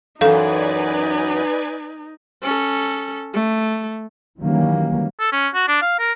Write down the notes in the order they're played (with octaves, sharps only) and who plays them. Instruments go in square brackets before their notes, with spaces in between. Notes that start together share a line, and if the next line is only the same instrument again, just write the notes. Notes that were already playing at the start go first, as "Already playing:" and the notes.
[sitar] F#2 E3 [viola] D#4 [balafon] A4 F5 [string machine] B4 D5 G#5
[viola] C#4 A4
A3
[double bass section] D#3 E3 F#3 G3 A#3 C#4
[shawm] A4
C#4
F#4
D4
F5
A#4